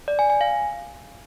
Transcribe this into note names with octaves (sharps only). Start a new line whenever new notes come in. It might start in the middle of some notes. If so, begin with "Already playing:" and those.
D5
G#5
G#5
F5